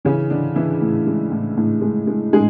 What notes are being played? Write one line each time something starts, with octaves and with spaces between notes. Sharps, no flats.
C#3 E3 C#4
D3 E3 D4
E3 E4
A2
G#3
A2
A2
G#3
G#3
A2 G#3 G#4